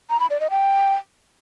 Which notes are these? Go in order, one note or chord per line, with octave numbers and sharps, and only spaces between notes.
A#5
B5
D5
D#5
G5